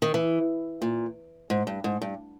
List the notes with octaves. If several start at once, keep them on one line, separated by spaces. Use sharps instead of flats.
D#3
E3
A#2
G#2
G2
G#2
G2